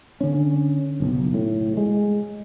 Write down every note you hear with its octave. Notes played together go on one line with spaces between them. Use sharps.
D3 C#4
F#1 B1
A2
G#3